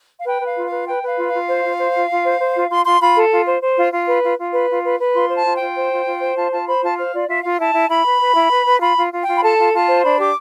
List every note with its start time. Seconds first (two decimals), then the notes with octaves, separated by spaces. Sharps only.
0.19 F5
0.26 B4 G5
0.41 B4
0.46 F5
0.57 F4
0.67 B4 F5
0.87 B4 G5
1.02 B4
1.07 F5
1.18 F4
1.28 F4 F5
1.48 C5
1.64 F4
1.78 C5
1.94 F4
2.10 F4
2.24 C5
2.40 C5
2.55 F4
2.70 F4 C6
2.85 F4 C6
3.00 F4 B5
3.16 A4
3.31 F4
3.47 C5
3.62 C5
3.77 F4
3.93 F4
4.07 B4
4.23 F4
4.39 F4
4.53 B4
4.69 F4
4.84 B4
4.99 B4
5.14 F4 C6
5.30 C5
5.36 A5
5.46 F4
5.56 G5
5.61 F4
5.76 C5
5.91 F4
6.06 F4
6.22 C5
6.36 F4 A5
6.52 F4 A5
6.67 C5 B5
6.82 F4 A5
6.97 C5 F5
7.13 F4 D5
7.28 F4 E5
7.43 F4 F5
7.59 E4 A5
7.74 E4
7.89 E4 B5
8.05 B4
8.20 B4
8.36 E4
8.51 B4
8.66 B4
8.81 F4 B5
8.97 F4
9.12 F4
9.22 G5
9.27 F4
9.37 B5
9.43 A4 A5
9.58 F4
9.73 F4 A5
9.88 C5
10.03 D4 B5
10.18 G4 D6